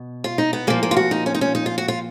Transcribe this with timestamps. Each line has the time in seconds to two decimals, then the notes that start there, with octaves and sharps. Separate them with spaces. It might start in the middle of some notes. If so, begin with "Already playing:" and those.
Already playing: B2
0.24 F4
0.38 D#4
0.53 B3
0.67 A#2 F3 A#3
0.83 A#3
0.91 F4
0.97 F#4
1.11 D#4
1.26 C#4
1.35 D#4
1.41 C#4
1.55 D#4
1.66 F4
1.78 F#4
1.88 F4